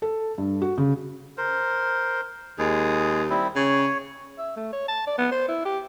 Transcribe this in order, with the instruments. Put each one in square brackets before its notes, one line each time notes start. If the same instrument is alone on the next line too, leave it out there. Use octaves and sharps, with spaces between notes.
[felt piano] A4
G2
F#4
C#3
[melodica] A#4 C5
[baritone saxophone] D#2 [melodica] G#3 G#4
[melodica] G3 C4 E4
[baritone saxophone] C#3 [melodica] C#5
[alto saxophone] E5
A3
C#5
A5
D5
B3
C5
E4
G4